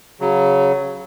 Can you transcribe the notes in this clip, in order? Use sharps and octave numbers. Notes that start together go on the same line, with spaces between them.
C#3 F#3